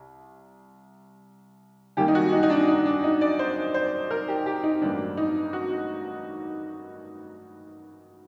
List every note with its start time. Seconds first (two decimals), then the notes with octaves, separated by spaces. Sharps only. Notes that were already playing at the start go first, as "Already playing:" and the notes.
Already playing: C2
1.97 F#2 D#3 G3 A#3 G4
2.08 D#4
2.15 F#4
2.32 D#4
2.43 D#4
2.50 D4
2.68 D#4
2.86 D4
3.04 D#4
3.21 D5
3.39 C5
3.74 C5
4.11 A#4
4.28 G4
4.46 G4
4.64 D#4
4.82 A1 G2 F#3 A#3 D4
5.17 D#4
5.53 F#4